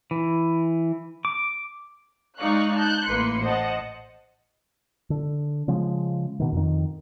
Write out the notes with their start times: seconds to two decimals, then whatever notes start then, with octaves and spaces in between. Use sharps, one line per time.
0.11 E3
1.25 D6
2.38 G#3 D#4 D5 F5 C#6 F#6
2.75 A5 F#6 G6
3.05 A1 A#3 B4 C6 C#7
3.44 C5 D#5 F#5 A5
5.10 D3
5.68 C#3 F3 G#3
6.40 B2 D#3
6.53 F2 D#3